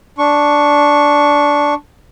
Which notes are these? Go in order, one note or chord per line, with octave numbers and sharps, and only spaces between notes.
D4 C#6